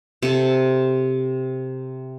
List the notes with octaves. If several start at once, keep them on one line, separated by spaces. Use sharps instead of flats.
C3 A4